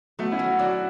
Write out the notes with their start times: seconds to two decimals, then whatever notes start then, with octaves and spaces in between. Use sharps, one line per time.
0.19 F#3 A3 B3
0.32 C#4 E4
0.39 F#3
0.59 F#3 D4 F#4